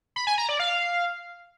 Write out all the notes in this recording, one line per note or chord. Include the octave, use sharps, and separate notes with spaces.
B5
G#5
A#5
D5
F5